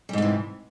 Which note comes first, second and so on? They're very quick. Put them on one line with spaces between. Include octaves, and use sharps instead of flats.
G3 G#2 C3 E3